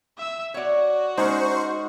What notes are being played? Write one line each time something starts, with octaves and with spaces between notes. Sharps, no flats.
E5 E6
F#4 C#5 D5
G#3 C#4 D#4 C5 C#6